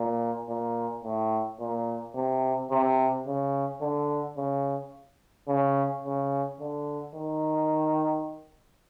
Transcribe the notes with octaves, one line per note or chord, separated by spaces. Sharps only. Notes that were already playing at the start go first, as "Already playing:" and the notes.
Already playing: A#2
A#2
A2
A#2
C3
C3
C#3
D3
C#3
C#3
C#3
D3
D#3